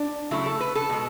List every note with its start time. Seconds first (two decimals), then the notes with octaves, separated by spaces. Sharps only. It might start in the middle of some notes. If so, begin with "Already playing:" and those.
Already playing: D4
0.31 C#3 F#3 A3 E4
0.46 A4
0.61 B4
0.75 A4
0.89 B2 G#3